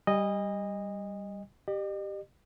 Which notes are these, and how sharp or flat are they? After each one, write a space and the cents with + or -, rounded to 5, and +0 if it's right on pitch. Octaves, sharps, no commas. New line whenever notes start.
G3 +0 D#5 -5 G#5 -40
G4 +0 D#5 -45